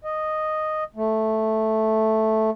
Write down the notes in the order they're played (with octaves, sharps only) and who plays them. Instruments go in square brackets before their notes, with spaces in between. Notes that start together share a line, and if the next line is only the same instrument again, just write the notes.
[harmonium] D#5
A3